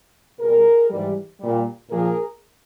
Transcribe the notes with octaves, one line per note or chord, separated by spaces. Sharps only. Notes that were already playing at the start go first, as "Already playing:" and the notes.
B2 G3 G#4 A#4
G#2 E3 G3
A#2 G3
A#2 F3 G#4 A#4